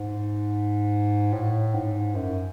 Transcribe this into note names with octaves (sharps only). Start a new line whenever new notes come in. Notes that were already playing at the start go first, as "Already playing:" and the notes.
Already playing: G#2
A2
G#2
F#2